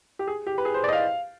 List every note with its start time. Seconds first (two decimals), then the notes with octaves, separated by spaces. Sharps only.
0.19 G4
0.27 G#4
0.47 G4
0.58 B4
0.65 G#4
0.74 C5
0.84 D5
0.88 D#5
0.93 F5